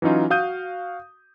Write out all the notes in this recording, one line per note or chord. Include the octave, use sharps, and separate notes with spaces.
E3 F#3 C#4 D#4 F4
F#4 F5 D#6 G6 D#7